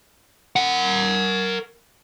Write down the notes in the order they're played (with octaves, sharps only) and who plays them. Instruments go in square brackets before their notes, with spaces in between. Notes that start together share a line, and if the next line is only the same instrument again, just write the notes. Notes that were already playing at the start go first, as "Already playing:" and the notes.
[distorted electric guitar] A#4 F#5